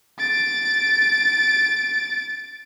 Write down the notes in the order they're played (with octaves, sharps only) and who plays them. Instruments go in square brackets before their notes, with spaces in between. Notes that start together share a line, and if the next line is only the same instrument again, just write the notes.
[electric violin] A6 D7